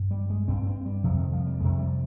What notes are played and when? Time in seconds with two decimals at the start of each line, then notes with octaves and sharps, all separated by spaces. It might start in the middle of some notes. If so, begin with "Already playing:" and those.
Already playing: G2
0.11 G3
0.30 G#3
0.48 G2 C4
0.67 C4
0.86 G3
1.04 F2 C3 F3
1.18 D#3
1.33 F3
1.46 G3
1.60 F2 C3 G#3
1.72 G#3
1.79 G3